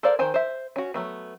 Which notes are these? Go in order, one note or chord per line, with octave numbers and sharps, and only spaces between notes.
A4 A#4 C5 D5 F5
D#3 C5 G5 G#5
C5 E5
C#4 F#4
F#3 A3 B3